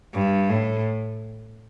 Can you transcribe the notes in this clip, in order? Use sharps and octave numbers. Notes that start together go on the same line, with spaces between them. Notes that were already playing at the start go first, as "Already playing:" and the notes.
G2
A2